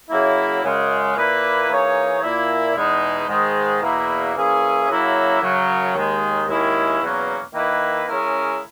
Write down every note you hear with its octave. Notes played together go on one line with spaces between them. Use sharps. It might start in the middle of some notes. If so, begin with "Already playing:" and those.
C#3 F#3 A#3 E4
F#2 C#3 G#3
A#2 A#3 E4 B4
E3 A#3 D#4 G#4 C#5
A#2 A#3 E4
E2 B2 G#3 D#4
G#2 D#3 G#3
E2 B2 A#3 E4
E3 A#3 C#4 E4 G#4
F#2 C#3 F#3 A#3 E4
F#2 C#3 F#3
D#2 D#3 G#3
D#2 D#3 G#3 C#4 E4
E2 B2 F#3 A#3 C#4
D#3 A#3 E4 B4
C#3 G#3 C#4 E4 A#4